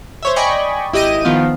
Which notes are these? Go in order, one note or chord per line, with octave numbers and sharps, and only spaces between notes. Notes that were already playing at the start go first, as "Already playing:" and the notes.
C5 C#5 E5
D5 D#5 G5 G#5 B5 C#6
G#1 E4 G4 D#5 A#6 D#7
D#3 F3 B3 F4